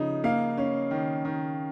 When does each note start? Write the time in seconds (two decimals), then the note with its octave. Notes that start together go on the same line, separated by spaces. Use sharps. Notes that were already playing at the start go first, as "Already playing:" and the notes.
Already playing: C#3 F3 D#4
0.24 A#3 F5
0.57 C#4
0.91 D#3
1.25 D#3